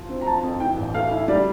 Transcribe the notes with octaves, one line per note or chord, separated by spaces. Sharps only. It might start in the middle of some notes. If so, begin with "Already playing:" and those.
Already playing: F3
C4
A#5
F3 A5
F2
E3 G5
A1
A3 F5
E4
G3 D5